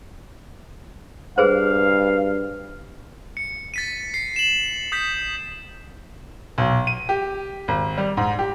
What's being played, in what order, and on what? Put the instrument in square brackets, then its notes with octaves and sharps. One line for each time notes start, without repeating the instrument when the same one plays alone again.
[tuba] G2 [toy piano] G#4 B4 C5 [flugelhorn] F5
[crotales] C#7
A6 B6 D#7
C7
E7 F#7
D#6 G6 B6
[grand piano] B1
D#7
G4
G#1
G3
G#2
G4